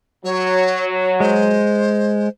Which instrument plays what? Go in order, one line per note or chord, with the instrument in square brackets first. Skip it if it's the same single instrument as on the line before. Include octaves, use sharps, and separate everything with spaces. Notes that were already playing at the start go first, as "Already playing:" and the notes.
[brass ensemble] F#3 [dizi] C#5
[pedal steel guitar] G#3 [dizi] C5